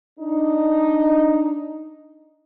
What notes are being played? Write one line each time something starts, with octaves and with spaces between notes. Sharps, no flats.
D4 D#4